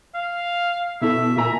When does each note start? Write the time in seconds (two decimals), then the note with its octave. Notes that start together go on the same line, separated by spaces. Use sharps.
0.14 F5
1.01 B2 E4 A4 E5
1.37 A#2 E5 G#5 A#5